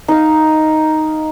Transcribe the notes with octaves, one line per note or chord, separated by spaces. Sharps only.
D#4 F5